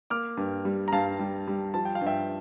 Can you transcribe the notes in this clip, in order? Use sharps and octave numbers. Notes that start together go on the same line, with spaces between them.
A#3 D6 F6
G2
G3
A#5
G2 F5 A5
G3
G3
F3 A5
G5
F5
G2
E5 G5